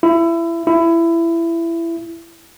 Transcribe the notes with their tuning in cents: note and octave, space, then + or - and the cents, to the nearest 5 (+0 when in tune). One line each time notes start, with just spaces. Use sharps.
E4 +25
E4 +20